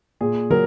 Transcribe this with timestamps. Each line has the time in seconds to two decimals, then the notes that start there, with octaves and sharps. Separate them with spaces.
0.21 A#2 G#4
0.50 F#3 A#4